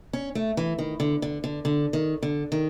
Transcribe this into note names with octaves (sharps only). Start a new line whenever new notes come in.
C#4
A3
E3
D#3
D3
D3
D3
D3
D#3
D3
D#3